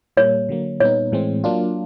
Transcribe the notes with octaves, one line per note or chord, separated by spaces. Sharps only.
A#2 G3 A#3 C#5
D3 F#3 A#3
A#2 G3 B3 D#4 C#5
A2 E3 G#3 C4
F#3 A#3 D4 F4